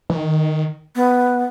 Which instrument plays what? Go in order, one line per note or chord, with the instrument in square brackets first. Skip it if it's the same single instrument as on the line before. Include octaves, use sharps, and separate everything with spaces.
[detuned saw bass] E3
D#3
[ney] B3